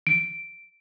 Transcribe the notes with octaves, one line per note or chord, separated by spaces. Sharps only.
D7